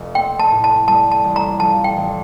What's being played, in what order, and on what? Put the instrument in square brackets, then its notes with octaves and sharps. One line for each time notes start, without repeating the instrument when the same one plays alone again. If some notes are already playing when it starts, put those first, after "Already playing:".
Already playing: [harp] F1
[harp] C4 [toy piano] G5
[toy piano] A5
[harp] A2
[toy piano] A5
[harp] G3 [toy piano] A5
[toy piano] A5
[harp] A1
[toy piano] A#5
[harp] F3 [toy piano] A5
[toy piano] G5
[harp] A1